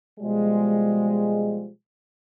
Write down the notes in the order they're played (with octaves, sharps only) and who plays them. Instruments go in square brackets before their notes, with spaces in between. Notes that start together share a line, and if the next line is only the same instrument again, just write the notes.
[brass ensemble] B2 F3 G3 G#3